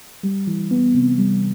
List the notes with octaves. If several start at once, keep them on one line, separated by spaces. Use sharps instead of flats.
G3
E3
B3
C3
G3